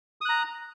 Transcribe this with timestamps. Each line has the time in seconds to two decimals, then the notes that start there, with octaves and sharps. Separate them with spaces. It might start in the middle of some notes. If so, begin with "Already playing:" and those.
0.21 D#6
0.25 F#6
0.29 A#5